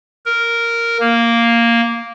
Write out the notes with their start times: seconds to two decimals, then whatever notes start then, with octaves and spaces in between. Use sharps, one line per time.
0.26 A#4
1.00 A#3